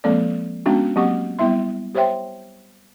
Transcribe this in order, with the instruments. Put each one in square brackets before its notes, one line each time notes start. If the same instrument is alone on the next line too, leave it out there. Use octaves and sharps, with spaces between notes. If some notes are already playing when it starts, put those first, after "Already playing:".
[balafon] F3 G#3 A#3 C4 A4 D5
G#3 B3 C#4 D4 F#4
F#3 A#3 C4 G4 F#5 C#6
G3 B3 E4 E5 C6
G4 C5 C#5 E5 G5 C6